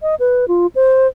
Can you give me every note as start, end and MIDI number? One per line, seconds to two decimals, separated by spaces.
0.02 0.15 75
0.20 0.45 71
0.48 0.67 65
0.75 1.07 72